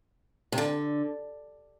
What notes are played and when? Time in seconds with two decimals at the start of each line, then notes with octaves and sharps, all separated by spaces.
0.52 C3
0.58 D3